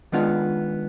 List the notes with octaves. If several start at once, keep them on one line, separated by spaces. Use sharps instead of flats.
D#3 G#3 B3 D4 F4